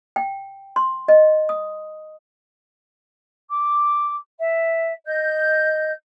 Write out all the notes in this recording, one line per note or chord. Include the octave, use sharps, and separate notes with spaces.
G5
C6
D#5
D#6
D6
E5
D#5 G6